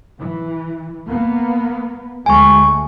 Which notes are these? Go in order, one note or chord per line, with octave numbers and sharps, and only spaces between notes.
E3
A#3 B3
D2 G#3 A3 G#5 C#6